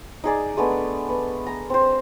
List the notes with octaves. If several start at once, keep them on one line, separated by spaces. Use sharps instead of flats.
D#4 G#4 D5
G#3 A3 B3 D4
B3
A#5
C4 C5